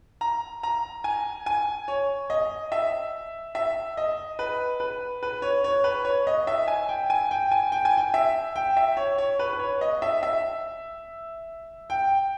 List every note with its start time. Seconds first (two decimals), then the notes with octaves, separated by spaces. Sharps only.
0.21 A#5
0.63 A#5
1.04 G#5
1.46 G#5
1.88 C#5
2.30 D#5
2.72 E5
3.55 E5
3.97 D#5
4.39 B4
4.80 B4
5.23 B4
5.42 C#5
5.64 C#5
5.84 B4
6.05 C#5
6.27 D#5
6.47 E5
6.68 G#5
6.89 G5
7.10 G#5
7.31 G5
7.51 G#5
7.72 G5
7.85 G#5
7.97 G5
8.14 E5
8.56 G5
8.77 E5
8.97 C#5
9.18 C#5
9.39 B4
9.53 B4
9.59 C#5
9.81 D#5
10.02 E5
10.23 E5
11.90 G5